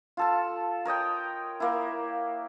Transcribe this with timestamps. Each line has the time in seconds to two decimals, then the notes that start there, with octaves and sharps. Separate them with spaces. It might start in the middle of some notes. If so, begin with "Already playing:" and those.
0.17 F4 A4 A5
0.85 A#4 C#5 D#5 G5
1.60 A#3 E4